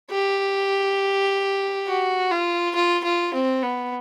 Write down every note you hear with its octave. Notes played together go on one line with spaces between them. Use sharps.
G4
F#4
F4
F4
F4
C4
B3